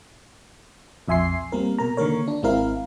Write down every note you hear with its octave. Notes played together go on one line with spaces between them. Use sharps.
A#1 F2 E5 G#5 C6 C7
G3 A#3 C4 A#4
B2 A#4 A#5
D3 D#3 A#3 A#4 C#5
D4
G#1 G#3 C4 E4 A#4 F5